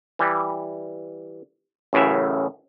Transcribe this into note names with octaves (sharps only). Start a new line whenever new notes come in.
E3 G3
A1 F#2 A2 C#3 E5